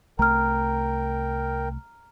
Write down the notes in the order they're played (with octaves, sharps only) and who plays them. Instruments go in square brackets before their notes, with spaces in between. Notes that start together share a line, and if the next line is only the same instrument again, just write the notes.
[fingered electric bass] C2 A3 [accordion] A#4 G5 [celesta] A#5 F6